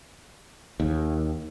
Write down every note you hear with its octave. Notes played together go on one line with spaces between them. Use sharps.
D#2